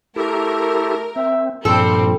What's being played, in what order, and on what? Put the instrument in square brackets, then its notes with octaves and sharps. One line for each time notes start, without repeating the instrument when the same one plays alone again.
[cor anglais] A3 [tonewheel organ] E4 G4 A4 [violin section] A#4
[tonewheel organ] C4 [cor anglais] E5
[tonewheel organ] G2 A#2 F3 [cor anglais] G3 [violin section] C4 [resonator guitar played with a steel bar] A4